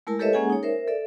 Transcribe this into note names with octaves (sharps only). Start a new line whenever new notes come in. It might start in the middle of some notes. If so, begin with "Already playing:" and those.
G#3 A3 E4 A#4 A5
G4 A4 B4 C#5 D#5 E5
G#3 A#3 C#4 G#4 F#5 G#5
D#4 C#5
A#4 C5 E5
A4 D5 E5